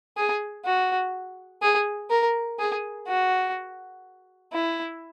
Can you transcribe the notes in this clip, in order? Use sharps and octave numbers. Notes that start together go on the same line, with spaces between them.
G#4
F#4
G#4
A#4
G#4
F#4
E4